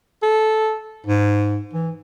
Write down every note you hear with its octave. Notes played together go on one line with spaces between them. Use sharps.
A4
G#2
E3